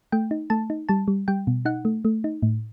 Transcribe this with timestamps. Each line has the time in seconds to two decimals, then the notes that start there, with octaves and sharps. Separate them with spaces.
0.12 A3 G5
0.31 D#4
0.50 A3 A5
0.70 D#4
0.89 G3 A5
1.08 G3
1.28 G3 G5
1.47 B2
1.65 D#4 F#5
1.85 A3
2.05 A3
2.24 D#4
2.42 A2